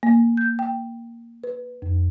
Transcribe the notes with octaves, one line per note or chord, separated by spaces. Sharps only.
A#3
G6
G5
B4
F2